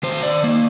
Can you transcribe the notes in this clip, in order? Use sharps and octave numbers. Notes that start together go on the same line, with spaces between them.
D#3 C5
D5
A#3